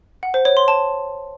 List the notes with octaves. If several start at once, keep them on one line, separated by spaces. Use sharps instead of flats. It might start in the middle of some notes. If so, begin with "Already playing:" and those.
F#5
C5
C#5
C6
A5